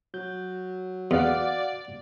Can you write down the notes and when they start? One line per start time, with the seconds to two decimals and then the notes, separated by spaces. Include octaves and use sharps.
0.14 F#3 G6
1.11 E2 F#4 D5 F5 F#5